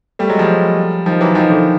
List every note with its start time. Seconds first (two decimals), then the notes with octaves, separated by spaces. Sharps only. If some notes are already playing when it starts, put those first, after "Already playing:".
0.19 G3 A3
0.29 F#3 G#3
0.39 F3 G3
1.06 D#3 F3
1.21 E3 F#3
1.35 D#3 F3
1.50 D3 E3